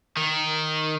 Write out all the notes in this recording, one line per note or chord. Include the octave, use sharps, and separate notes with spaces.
D#3